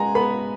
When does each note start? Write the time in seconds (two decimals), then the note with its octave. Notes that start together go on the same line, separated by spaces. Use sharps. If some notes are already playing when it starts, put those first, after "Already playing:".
Already playing: G#3 B3 F#5 G#5 A#5
0.15 B3 B5